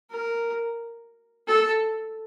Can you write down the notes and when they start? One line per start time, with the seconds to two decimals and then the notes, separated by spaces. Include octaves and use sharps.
0.11 A#4
1.48 A4